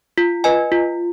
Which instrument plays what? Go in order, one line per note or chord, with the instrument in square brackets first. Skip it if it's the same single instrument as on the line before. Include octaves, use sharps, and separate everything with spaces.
[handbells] F4
B4 D#5 G#5
F4